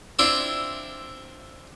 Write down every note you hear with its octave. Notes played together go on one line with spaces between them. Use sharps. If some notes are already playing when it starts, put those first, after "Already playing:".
C4 D4 E4 F4 E5